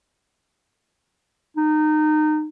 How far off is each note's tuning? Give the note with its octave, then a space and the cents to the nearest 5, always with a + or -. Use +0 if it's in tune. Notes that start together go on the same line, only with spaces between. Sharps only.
D#4 -25